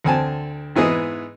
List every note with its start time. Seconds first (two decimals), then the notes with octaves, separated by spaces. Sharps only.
0.04 D2 C4 G#5 A5
0.76 G#2 E3 B3 G#4 D#5